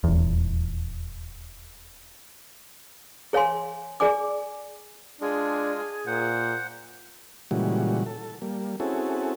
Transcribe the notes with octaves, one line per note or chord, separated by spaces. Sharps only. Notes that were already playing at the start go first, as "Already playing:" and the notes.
D#1 E2
G#4 C#5 F5 G#5 C6
G#4 D5 G#5 D6
G#3 D4 F4 G#4
A#2 C5 F#5
A#2 C#3 E3 G3 G#3 F#4
A4
G3 A#3
C4 C#4 E4 F#4 G#4 A4